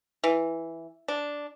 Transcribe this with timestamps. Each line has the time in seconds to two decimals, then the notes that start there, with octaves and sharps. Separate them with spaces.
0.24 E3
1.08 D4